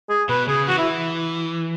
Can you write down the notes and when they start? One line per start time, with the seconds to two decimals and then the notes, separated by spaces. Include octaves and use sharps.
0.09 G#4
0.29 B2 B4
0.48 C#3 G#4
0.68 E3 F#4
0.78 E4